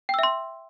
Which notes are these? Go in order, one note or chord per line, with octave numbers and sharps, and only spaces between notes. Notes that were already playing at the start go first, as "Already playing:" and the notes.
E5 G5 C6 E6